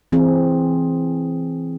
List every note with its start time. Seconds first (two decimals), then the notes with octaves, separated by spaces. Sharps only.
0.12 E3 C4 G#4